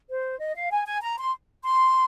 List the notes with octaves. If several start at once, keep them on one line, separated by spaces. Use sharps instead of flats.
C5
D#5
F5
G#5
G#5
A#5
C6
C6